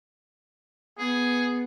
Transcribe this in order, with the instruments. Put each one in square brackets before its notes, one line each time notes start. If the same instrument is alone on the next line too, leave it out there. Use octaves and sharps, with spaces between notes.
[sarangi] B3 [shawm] G#4